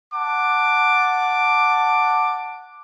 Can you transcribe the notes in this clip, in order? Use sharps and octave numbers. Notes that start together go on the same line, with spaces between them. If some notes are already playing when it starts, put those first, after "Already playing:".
F#5 A5 D6